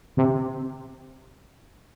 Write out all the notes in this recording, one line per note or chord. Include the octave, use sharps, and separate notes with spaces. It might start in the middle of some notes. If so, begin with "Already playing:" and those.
C3